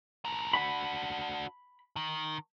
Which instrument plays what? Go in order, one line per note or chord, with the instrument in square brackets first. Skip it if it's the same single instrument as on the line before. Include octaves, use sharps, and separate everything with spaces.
[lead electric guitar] A2 A#4
[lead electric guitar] D4 F#4 [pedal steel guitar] B5
[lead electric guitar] D#3